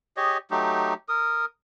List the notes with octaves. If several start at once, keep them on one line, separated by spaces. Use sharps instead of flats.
G4 G#4 C#5 D#5
F#3 A3 D#4 G4
A#4 D#6